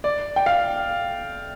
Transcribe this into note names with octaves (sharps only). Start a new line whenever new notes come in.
D5
G5
F5